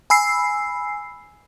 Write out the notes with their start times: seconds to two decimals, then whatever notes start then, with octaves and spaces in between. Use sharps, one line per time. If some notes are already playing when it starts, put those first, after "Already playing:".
0.10 G#5 B5 E6 C7